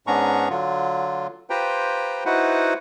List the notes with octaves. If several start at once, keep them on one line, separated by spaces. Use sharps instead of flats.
G#2 B3 C#4 D4 A#5 C#6
D3 F#3 F4
F4 G4 B4 C5 G5 A#5
D#4 E4 F#4 B4 C5 F#5